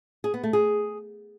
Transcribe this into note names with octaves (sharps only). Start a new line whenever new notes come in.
G#4
B3
A3
G#4